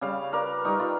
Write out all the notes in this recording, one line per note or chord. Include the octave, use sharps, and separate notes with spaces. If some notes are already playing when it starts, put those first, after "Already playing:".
C#3 G3 C#5 F5
A#4 B4 D5
G3 D#4 C#6
F4 B4